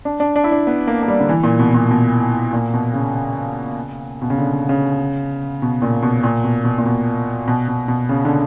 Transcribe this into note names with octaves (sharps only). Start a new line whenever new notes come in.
D4
D4
D4
E4
D4
B3
A#3
A#3
G3
D3
E3
A#2
B2
A#2
B2
A#2
B2
C#3
B2
C#3
D3
C#3
B2
A#2
B2
A#2
B2
B2
A#2
B2
B2
B2
B2
C#3
D3